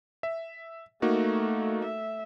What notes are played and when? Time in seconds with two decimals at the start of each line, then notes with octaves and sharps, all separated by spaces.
0.23 E5
1.02 A3 A#3 D#4 F#4
1.84 E5